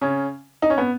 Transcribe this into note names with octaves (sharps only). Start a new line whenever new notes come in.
C#3 C#4
D#4
C#4
B3